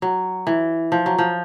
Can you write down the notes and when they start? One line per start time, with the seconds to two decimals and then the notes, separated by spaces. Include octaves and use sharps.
0.02 F#3
0.47 E3
0.92 F3
1.06 F#3
1.18 F3